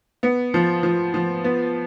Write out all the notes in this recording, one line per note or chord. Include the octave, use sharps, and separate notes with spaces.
B3
F3
F3
F3
B3